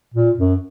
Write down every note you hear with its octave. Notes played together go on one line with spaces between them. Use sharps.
A#2
F#2